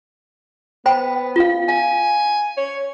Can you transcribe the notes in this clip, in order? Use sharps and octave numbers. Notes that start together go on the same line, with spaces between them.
B3 C5 G5 B5
F4 F5
F5 G#5
C#5